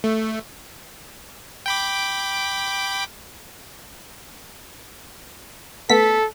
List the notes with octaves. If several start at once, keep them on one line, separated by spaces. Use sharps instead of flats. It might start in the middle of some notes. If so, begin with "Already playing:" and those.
A3
G5 B5 D6
A3 B3 A4 B6